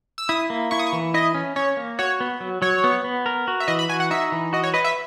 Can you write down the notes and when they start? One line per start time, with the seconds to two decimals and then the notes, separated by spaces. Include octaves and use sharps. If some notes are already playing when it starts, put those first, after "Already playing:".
0.18 E6
0.29 E4 D#6
0.50 A#3
0.71 E4 C#6
0.79 D#6
0.87 C#6
0.93 E3
1.14 E4 D#5
1.35 C#4
1.56 C#4 C#5
1.77 A#3
1.99 F#4 C#5
2.20 B3
2.40 F#3
2.62 F#3 C#5
2.84 B3
3.04 B3
3.26 A#4
3.48 F#4
3.60 E5
3.68 E3 D#5
3.79 B5
3.89 F#4 G#5
4.00 F#5
4.11 D#4 E5
4.32 E3
4.53 F#4 D#5
4.64 C#5
4.74 B4 D#5
4.84 E5